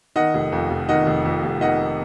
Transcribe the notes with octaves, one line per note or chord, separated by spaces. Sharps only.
D#3 D#5 F#5
F1
F2
F1
D#3 D#5 F#5
F1
F2
F1
D#3 D#5 F#5